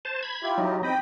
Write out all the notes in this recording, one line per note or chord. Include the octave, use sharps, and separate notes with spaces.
C5 A5
B5 G#6
E4 F4 G4
F#3 D#4
C4 D#5 G5 B5